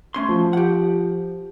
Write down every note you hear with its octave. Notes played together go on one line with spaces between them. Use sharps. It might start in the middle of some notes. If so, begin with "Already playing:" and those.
A3 C#4 C6
F3
G4 F#5